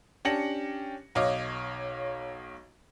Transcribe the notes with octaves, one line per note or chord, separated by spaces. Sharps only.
C#4 D4 G4 A#6 C#7 F#7
B1 C#5 D#5 F5 D6